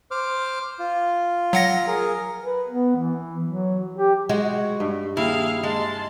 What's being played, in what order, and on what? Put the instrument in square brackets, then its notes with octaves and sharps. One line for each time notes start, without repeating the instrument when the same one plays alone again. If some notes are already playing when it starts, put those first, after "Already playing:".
[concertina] C5 D6 F6
F4
[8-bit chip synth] F#3 F#5 A#6
[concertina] G#4 A#4
[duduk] B4
B3
E3
F#3
G4
[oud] G#3 [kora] F#4
[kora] G2
[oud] D#2 [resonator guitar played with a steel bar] E4 [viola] G#4 F5
[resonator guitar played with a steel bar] G#3 [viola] A5 C6